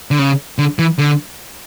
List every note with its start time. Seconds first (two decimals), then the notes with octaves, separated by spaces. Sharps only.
0.11 D3
0.19 C#3
0.59 D3
0.79 E3
0.98 D3